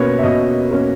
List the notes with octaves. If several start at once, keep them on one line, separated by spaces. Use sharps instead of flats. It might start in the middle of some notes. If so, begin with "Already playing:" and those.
Already playing: B2 A#3 C#4 B4 C#5
E5
B2 D#5
A#3 C#4